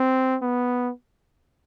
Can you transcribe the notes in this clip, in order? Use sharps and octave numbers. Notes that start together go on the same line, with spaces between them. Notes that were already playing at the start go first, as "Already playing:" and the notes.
Already playing: C4
B3